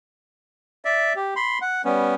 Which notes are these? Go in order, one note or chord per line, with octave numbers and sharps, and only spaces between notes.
D5 E5
G4
B5 C6
F#5
G3 B3 C#4